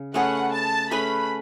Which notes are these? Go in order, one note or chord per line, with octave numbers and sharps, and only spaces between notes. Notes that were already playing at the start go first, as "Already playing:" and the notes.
Already playing: C#3
A3 C#4 G#4 B4 F#5
A5
A3 C#4 G#4 B4 B5